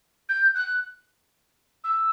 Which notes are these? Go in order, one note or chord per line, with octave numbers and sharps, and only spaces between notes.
G6
F#6
E6